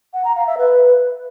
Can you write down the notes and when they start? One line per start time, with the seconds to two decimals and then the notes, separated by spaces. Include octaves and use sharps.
0.13 F#5
0.25 A#5
0.36 F5
0.47 E5
0.58 B4